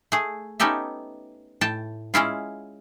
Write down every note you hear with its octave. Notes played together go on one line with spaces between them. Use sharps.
A3 G#4
B3 C#4 D#4 G4 A4 E5
A2 G5 A5
G#3 C#4 E4 F4